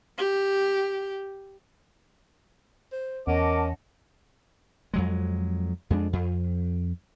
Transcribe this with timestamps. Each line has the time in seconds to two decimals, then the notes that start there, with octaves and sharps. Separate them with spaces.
0.18 G4
2.92 C5
3.27 E2 C#4 A#4 D#5 F#5 A5 D6
4.94 F2 F#3 G#3
5.90 F2 G#3 A#3 D4
6.13 F2